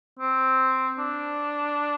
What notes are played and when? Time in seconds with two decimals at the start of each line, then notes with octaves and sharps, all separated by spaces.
0.19 C4
0.99 D4